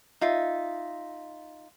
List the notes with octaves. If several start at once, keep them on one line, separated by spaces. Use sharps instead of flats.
D#4 F4 E5